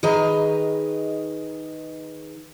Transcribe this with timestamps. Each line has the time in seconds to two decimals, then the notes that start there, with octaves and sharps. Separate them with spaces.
0.03 D#3 G#4 B4 D#5 A#5